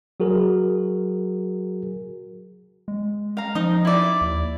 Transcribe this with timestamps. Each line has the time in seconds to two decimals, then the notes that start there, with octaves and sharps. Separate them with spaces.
0.20 F#3 F#4 G#4 A#4
2.88 G#3
3.37 F5 A#5
3.55 F3 D#4 D#6
3.85 E4 D5
4.21 D#2